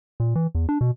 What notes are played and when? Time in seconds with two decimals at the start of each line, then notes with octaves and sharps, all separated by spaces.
0.20 A#2
0.35 E3
0.55 E2
0.69 D4
0.81 B2